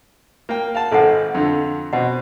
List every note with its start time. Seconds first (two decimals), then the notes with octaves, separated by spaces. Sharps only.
0.49 A#3 G5
0.75 F5 F#5 A5
0.92 G#1 G#2 A4 F#5
1.34 F2 D3
1.93 B2 C4 D#5 F#5